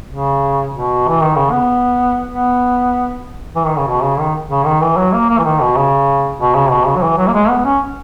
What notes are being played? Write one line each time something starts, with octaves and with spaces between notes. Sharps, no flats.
C#3
B2
E3
D#3
C#3
B3
B3
E3
D#3
C#3
B2
C#3
D#3
C#3
D#3
E3
F#3
A#3
A#3
E3
D#3
B2
C#3
B2
C#3
B2
C#3
F#3
E3
F#3
A#3
G#3
B3
C#4